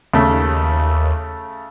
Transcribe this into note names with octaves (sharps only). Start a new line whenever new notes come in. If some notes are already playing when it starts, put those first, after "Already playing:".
D#2 C#3 A3